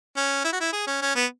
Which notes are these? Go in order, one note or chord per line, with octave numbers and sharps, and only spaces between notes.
C#4
E4
F#4
E4
G#4
C#4
C#4
B3